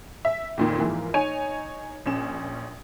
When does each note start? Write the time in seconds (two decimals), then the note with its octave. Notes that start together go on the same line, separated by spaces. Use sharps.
0.25 E5
0.57 F2 A#2 D#3
0.79 G#2 E3 F3 A#3
1.14 D#4 C#5 G#5 D#7
2.06 A#1 C#4 E7